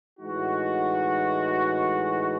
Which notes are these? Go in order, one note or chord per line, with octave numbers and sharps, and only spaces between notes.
A2 E3 G#3 D#4 F#4